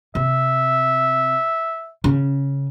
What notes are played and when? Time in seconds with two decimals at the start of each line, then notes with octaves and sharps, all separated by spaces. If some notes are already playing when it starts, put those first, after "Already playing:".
0.15 C3 E5
2.04 C#3